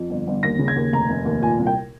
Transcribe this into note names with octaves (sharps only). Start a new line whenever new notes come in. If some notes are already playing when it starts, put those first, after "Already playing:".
Already playing: F2
G1
G1
D#2 A#6
C#3
G#6
D#2
F1 A#5
F1
D#2
A#2 G#5
C2
G5